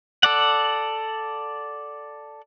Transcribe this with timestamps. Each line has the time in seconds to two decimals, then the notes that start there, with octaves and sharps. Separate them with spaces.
0.23 A4 D5 F#5